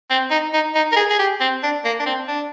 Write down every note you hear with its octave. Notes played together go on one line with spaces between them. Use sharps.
C4
D#4
D#4
D#4
A#4
G#4
G#4
G4
C4
D4
A#3
D4
C4
D4